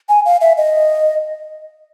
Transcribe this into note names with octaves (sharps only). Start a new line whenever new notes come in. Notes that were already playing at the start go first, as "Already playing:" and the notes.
G#5
F5
E5
D#5